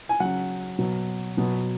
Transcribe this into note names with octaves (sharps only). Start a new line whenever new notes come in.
G#5
C#3 F#3 F#5
B2 F#3
B2 F#3